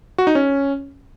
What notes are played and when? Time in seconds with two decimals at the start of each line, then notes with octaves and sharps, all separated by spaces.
0.18 F#4
0.27 D#4
0.35 C#4